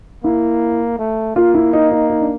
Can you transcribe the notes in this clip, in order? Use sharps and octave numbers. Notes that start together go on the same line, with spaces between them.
A#3 E4
A3
A#3 F4
E4
D#4
D#4
D#4
D4